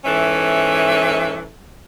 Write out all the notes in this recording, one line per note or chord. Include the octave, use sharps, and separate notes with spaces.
G#2 E3 C#4 A4 E5